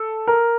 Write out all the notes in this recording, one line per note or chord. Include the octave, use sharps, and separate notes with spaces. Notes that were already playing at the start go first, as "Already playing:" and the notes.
Already playing: A4
A#4